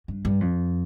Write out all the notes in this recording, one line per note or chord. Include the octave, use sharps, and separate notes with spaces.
G2
G2
F2